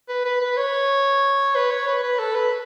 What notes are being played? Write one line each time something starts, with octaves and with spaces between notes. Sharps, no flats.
B4
B4
B4
C#5
B4
C#5
B4
B4
A4
B4